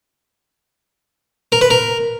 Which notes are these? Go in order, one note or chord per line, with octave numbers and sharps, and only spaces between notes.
A#4
B4
A#4